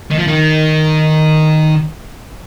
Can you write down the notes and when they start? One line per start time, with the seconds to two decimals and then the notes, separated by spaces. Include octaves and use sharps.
0.11 D#3
0.19 F3
0.27 D#3